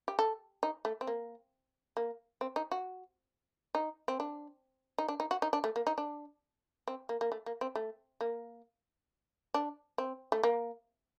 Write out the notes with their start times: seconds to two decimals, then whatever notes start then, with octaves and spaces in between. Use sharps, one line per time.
0.08 G4
0.19 A4
0.63 D#4
0.85 A3
1.01 C4
1.07 A#3
1.97 A#3
2.41 C4
2.56 D#4
2.71 F#4
3.75 D#4
4.08 C4
4.20 D4
4.98 D#4
5.08 D4
5.20 D#4
5.31 F#4
5.42 D#4
5.53 D4
5.64 A3
5.76 A#3
5.87 D#4
5.98 D4
6.88 C4
7.09 A#3
7.21 A#3
7.32 A3
7.46 A#3
7.61 C4
7.75 A3
8.21 A#3
9.54 D4
9.98 C4
10.32 A3
10.43 A#3